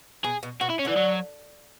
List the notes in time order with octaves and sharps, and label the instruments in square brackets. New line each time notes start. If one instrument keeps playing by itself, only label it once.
[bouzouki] B2 [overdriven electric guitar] G#4
[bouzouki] B2
[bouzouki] B2 [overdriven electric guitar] F#4
[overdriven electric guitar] E4
C#4
[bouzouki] D3 [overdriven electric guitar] E3
[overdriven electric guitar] F#3